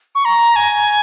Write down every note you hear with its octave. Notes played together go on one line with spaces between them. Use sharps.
C#6
A#5
G#5